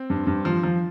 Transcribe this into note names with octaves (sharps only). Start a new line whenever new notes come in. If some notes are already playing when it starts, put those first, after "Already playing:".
Already playing: C4
G2
G2
F3
F3